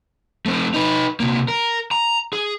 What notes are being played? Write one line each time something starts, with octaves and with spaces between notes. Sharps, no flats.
A3 C4
D#4 B4
C3 A#3
A#4
A#5
G#4